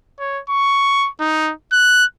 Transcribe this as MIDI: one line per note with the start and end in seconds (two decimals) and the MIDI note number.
0.20 0.41 73
0.49 1.09 85
1.20 1.52 63
1.72 2.04 90